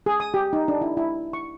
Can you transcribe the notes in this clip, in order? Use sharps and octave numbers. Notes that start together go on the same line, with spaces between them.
G#4
D#6
G4
D#4
D4
E4
E4
C#6